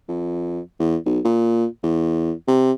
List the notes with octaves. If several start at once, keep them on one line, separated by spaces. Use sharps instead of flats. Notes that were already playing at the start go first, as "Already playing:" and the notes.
F2
E2
B1
A#2
E2
C3